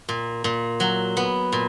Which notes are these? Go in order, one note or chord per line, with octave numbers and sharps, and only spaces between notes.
A#2
A#2
F#3
B3
A#2